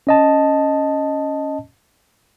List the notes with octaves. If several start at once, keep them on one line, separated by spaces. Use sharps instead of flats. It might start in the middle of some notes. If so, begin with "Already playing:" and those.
C#4 D#5 A5